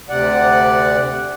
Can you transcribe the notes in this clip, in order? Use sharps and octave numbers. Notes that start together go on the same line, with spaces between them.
D2 C3 D5 F#5